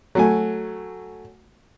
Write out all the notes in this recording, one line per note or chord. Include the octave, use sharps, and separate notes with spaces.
F#3 A3 G#5